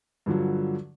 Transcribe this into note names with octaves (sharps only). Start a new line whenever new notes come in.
G2 D3 F3 F#3